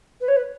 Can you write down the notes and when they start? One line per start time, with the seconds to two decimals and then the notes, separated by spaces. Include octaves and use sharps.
0.21 B4
0.28 C#5
0.36 B4